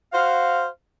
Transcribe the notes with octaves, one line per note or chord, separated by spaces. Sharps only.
F#4 C5 F5